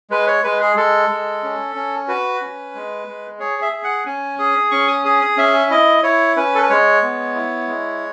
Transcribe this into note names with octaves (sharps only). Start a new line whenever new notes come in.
G#3 B4
C#5
G#3 B4
G#4
G#3 A4
G#3
C#4
C#4
F#4 B4
C#4
G#3
G#3
G#4 C#5
E5
G#4
F#5
C#4 G#5
G#4 D#6
C#4 C#6
D#6
G#4 D#6
D#6
C#4 E5
E4 D#5
E4 C#5
C#4 B4
A4
B4
G#3 C#5
B3
E4
G#3